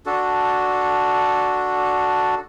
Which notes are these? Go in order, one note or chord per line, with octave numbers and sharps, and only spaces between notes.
D4 F#4 A4